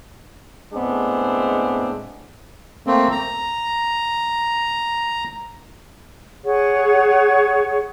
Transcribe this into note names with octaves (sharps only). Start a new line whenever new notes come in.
A2 G#3 B3 C4 D4
A3 A#3 C4
A#5
G#4 C#5 F#5 C#6